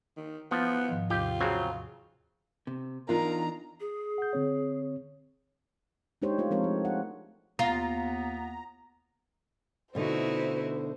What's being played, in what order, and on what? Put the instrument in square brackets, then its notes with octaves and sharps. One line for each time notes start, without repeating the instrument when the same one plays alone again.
[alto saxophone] D#3
[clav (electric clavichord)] F3 [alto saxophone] B3
[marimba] G#2 D#3 F3
[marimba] D#2 C3 G6 [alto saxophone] F4 [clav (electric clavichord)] G4
[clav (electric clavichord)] C#3 F#3 C4 [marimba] F#4 G#4
[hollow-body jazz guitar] C3
[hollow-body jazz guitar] E2 D4 D#4 [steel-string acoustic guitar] F4 [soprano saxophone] A#4 [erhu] A#5
[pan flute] G#4
[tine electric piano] F#5 G6
D3 C4 C#5
[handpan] G#3 D4 D#4 G4 C5 C#5
A3 F4 C5
F3 G#3 C4 A#4 C5 C#5
A3
F#5
[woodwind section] D#2 B3 [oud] F4 [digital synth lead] A#5
[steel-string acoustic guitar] B2 D3 A3 [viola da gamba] D#4 E4 F#4 [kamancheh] C5